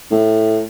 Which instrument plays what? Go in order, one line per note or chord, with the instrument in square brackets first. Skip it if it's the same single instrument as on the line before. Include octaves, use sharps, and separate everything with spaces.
[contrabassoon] A2